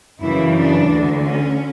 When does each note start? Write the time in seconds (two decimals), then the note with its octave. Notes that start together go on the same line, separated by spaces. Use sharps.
0.21 F#2 C#3 E3 E4
0.56 D4
0.89 D2 D3
1.23 C#4